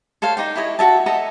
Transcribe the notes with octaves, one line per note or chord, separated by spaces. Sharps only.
A4 C5 C#5 F5
D#4 D5 G5
E4 G4 C#5 D#5
F#4 E5 A5
A4 D#5 E5 A#5